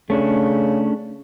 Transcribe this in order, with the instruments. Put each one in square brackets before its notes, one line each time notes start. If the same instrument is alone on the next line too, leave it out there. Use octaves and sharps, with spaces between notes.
[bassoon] C#3 [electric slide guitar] A3 C#4 D4